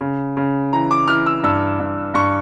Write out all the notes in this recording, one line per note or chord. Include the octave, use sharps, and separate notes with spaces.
C#3
C#3
E3 A#5
D6
E3 F6
E6
G2 E6
G2
G2 C#6